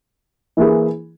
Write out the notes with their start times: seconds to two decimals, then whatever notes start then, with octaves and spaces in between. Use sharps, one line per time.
0.57 E3 A#3 E4 G#4